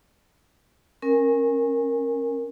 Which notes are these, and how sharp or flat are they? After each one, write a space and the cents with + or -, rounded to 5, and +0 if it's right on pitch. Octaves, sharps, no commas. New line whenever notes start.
C#4 -30 A#4 +0 G#5 -20